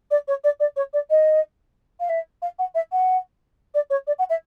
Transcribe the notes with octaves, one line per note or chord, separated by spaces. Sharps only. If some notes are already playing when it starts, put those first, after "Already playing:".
D5
C#5
D5
D5
C#5
D5
D#5
F5
E5
F5
F#5
E5
F#5
D5
C#5
D5
F#5
E5